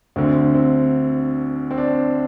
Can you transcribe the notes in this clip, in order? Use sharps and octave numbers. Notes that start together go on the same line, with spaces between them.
D2 D3 C4
C4
C4
D4